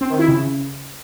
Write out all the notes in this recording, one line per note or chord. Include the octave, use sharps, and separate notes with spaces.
C4
D#3
E4
C#3